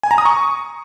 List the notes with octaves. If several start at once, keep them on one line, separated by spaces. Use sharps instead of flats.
G#5
A#5
D#6
C#6